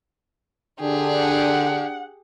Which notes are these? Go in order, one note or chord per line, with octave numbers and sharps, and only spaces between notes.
D3 D4 G4 G#4
F#5